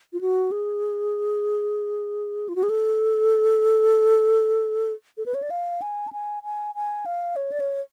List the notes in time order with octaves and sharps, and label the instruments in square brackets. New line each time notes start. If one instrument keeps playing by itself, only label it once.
[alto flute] F4
F#4
G#4
F4
F#4
G#4
A4
A4
B4
C#5
D5
F5
G#5
A5
G#5
G#5
G#5
F5
C#5
D5
C#5